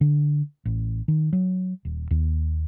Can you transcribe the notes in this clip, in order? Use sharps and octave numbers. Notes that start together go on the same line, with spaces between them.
D3
A1
D#3
F#3
D#1
D#2